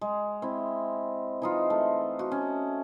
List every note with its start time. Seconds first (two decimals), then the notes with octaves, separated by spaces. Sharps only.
0.01 G#3
0.42 C4 E4
1.42 E3 D#4 F4
1.70 A3
2.19 F#4
2.32 C#4